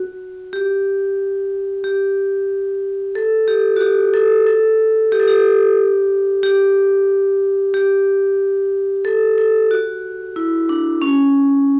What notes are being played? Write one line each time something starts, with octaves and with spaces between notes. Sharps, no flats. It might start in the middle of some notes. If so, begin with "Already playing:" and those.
Already playing: F#4
G4
G4
A4
G4
F#4
G4
A4
A4
G4
A4
G4
G4
G4
A4
A4
F#4
E4
D4
C#4